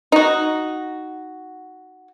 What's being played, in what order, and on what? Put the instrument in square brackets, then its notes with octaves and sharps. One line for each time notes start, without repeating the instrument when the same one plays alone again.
[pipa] D#4 F#4